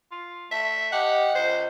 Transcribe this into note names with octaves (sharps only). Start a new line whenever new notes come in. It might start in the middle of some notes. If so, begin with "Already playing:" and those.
F4
A3 E5
G4 D#5 F#5
C#2 C5